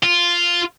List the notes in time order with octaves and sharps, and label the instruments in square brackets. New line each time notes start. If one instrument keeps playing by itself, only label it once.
[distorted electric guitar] F4